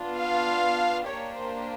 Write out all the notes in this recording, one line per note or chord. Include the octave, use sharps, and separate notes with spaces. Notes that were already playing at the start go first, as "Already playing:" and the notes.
Already playing: B3 D4 F4
F5
A#3 D4 G4 C#5
C5